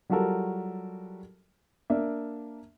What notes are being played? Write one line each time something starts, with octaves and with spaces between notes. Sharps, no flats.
F#3 G3 F4 F#4 A4 A#4
A#3 D4 E5